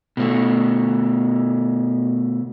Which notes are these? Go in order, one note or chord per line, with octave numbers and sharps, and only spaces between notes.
B2 A3